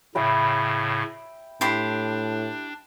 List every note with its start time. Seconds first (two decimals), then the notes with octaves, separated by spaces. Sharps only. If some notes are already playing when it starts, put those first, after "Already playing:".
0.15 A2 C#3 E5 G5 B5
1.61 A2 D4 E4 G4 C6